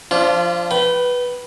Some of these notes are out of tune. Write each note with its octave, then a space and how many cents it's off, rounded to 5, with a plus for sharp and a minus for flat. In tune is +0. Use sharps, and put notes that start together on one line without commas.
F3 +0 D4 -20 F4 -25
B4 -5 G5 -35